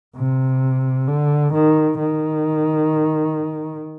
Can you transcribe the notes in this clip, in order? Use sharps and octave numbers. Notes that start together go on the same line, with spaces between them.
C3
D3
D#3
D#3